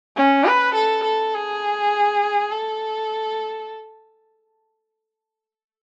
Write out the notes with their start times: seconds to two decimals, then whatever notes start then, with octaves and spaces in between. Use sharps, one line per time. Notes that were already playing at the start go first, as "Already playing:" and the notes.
0.16 C#4
0.45 B4
0.74 A4
1.04 A4
1.34 G#4
2.51 A4